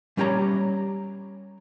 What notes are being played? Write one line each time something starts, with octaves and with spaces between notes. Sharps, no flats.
G3 C#4 G4 C#5 A#5